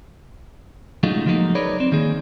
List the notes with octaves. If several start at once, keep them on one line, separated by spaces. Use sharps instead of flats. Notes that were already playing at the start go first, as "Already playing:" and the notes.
C#3 F#3 G#3 A3 D#4 F4
F3 F#3 G#3 A#3 D#4
D#4 G#4 A#4 B4 C#5 D5
C4
D#3 A#3 G#4